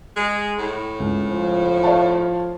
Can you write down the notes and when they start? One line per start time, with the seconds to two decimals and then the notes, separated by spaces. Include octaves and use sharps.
0.16 G#3
0.58 A2
1.00 C#2
1.31 F3
1.83 C#5 F5 A5